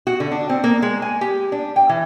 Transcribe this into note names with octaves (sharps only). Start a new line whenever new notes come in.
F#4
D3
D4
C4
A#3
G#3
G#5
G4
D4
G5
E3